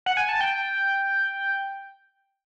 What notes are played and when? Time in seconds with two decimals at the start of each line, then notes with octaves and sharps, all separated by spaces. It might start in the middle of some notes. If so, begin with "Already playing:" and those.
0.06 F#5
0.17 G#5
0.29 A5
0.41 G5